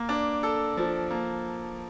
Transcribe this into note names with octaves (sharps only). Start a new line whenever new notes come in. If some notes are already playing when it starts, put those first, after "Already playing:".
Already playing: A#3
D4
A4
F3
A#3